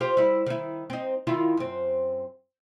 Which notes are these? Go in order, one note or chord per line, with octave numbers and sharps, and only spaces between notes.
F4 G4 C5
G3 E4
D#3 E4
C4 D#4
D#3 E4 F4
F#2 C4